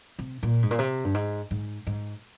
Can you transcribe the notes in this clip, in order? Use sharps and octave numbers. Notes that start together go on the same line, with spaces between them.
C3
A#2
G#2
A#2
C3
G2
G#2
G#2
G#2